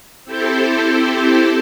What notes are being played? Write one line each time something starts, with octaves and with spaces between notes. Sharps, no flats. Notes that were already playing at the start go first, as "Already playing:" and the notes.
C4 E4 G4 A4 C5